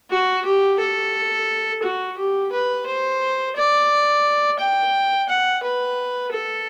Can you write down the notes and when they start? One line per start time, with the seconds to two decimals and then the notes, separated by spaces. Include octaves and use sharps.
0.10 F#4
0.45 G4
0.79 A4
1.83 F#4
2.17 G4
2.52 B4
2.86 C5
3.56 D5
4.59 G5
5.29 F#5
5.63 B4
6.32 A4